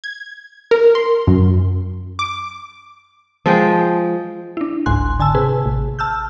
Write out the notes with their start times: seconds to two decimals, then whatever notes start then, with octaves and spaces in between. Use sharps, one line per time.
0.04 G#6
0.71 A#4
0.95 C6
1.27 F#2
2.19 D6
3.46 F3 G#3 G5
4.57 D4 E4
4.86 G1 C#2 G#2 G#5 C6 F#6
5.20 D3 G#5 A5 E6
5.34 C3 G#4 B4
5.66 A1
5.99 A5 E6 F6 G6